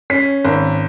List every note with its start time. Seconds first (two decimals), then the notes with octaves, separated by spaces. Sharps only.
0.10 C#4 B6
0.45 G#1